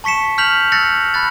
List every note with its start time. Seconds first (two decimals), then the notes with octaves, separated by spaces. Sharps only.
0.04 A5 C#6 B6 C#7 E7
0.38 F6 G6 B6 F7 F#7
0.72 E6 F#6 G6 A6 A#6 C#7
1.14 B5 F#6 A6